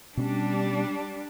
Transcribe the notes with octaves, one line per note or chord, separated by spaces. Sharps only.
B2 G3 C#4 D4